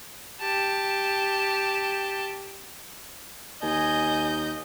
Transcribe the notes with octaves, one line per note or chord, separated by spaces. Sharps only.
G4 A5
D#2 D#5 G#5 G6